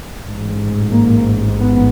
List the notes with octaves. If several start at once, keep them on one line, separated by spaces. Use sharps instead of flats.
A1 G#2
A#3
B3